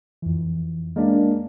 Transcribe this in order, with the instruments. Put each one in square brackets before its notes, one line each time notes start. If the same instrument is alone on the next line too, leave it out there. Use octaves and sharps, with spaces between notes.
[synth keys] F2 E3
[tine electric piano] G#3 A#3 D4 [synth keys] A#4 D5